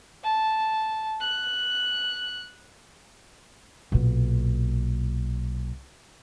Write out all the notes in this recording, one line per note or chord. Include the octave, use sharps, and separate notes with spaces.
A5
F#6
B1 A#2